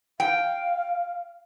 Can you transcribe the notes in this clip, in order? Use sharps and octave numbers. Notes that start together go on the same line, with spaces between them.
F5 G5